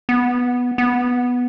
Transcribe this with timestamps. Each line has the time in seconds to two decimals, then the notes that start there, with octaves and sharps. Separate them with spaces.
0.09 B3
0.78 B3